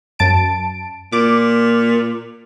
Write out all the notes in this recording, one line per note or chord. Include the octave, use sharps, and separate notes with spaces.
F#2 A5 D7
A#2 D6